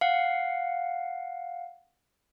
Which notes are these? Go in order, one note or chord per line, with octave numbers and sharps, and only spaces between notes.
F5 F#5